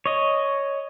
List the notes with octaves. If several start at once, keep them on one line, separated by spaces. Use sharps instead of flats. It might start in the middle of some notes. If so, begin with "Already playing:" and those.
C#5 D#5